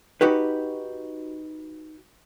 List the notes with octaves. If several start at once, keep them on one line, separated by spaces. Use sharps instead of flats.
D#4 F#4 G4 B4